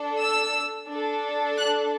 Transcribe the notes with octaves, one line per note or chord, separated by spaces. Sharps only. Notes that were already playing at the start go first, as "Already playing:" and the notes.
Already playing: D4 A4
E6
D4 A4
F#6